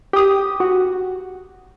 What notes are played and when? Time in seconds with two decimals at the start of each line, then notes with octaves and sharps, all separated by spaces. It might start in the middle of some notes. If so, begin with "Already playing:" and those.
0.13 G4 D#6
0.60 F#4